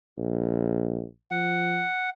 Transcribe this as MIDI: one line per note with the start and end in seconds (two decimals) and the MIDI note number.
0.18 1.04 34
1.31 1.85 53
1.31 2.10 78